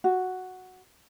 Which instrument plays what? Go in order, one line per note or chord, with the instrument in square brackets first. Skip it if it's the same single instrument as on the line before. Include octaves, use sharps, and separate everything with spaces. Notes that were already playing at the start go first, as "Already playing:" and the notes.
[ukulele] F#4